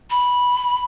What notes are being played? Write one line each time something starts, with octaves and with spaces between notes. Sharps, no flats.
B5